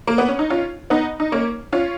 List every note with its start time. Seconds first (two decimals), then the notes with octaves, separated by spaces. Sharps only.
0.07 A#3
0.18 B3
0.28 C#4
0.39 D#4
0.50 C#4 F4
0.90 B3 D#4
1.20 D#4
1.32 A#3 C#4
1.73 C#4 F4